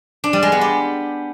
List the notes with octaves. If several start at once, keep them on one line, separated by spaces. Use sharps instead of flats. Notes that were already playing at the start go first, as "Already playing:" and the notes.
D4
G3
G#3
B3
G4